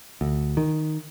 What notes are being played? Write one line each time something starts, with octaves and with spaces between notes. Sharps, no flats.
D2
D#3